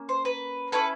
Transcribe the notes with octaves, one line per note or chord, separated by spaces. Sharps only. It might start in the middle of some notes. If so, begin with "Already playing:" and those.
Already playing: A#3 C#4
C5
B4
C#4 E4 A4 B4